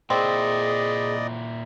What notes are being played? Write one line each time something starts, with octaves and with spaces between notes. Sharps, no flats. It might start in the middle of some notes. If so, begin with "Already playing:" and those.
A#2 C4 E4 G#4 D5 D#5